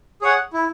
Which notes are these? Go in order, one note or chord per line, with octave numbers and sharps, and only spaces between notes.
G#4 C#5 F#5
E4